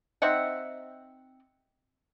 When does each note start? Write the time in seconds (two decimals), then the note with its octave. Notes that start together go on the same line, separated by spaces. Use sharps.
0.22 C4 D#4 E5 F#5